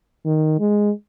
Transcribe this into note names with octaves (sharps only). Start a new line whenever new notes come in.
D#3
G#3